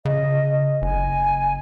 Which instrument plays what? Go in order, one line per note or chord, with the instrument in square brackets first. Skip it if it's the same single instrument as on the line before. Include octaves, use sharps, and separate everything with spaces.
[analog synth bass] C#3 [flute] D#5
[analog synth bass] F#1 [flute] G#5